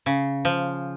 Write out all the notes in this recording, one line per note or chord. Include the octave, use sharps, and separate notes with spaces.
C#3
F3